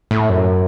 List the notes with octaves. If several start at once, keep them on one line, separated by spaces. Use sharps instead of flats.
A2
F#2